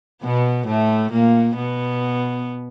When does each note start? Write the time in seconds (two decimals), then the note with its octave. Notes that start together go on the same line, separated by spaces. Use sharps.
0.23 B2 B3
0.67 A2 A3
1.11 A#2 A#3
1.56 B2 B3